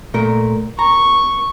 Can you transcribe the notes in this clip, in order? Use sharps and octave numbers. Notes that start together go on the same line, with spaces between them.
A#2 A3 A#4
A#5 C#6